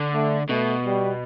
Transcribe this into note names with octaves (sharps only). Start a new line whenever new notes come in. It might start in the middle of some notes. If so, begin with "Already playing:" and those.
Already playing: D3
A3
B2 A3
G3